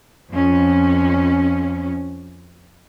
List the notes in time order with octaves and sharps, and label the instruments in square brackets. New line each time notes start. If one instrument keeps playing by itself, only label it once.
[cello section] F2 C#4